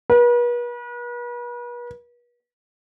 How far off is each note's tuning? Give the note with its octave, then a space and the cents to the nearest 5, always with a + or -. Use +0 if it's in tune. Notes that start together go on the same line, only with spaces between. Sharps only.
B4 -40